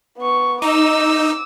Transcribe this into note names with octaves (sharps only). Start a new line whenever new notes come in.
B3 C#6
D#4 D6 E6